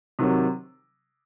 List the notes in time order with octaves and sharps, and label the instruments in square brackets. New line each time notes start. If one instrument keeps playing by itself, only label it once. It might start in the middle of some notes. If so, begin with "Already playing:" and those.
[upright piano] C3 D#3 F#3